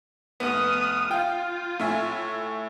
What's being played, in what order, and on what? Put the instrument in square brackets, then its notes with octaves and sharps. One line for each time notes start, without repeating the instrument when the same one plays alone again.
[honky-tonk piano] F1 B3 [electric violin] D#6 F6
[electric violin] F4 [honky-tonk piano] F5 G5
[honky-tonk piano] A2 E5 G#5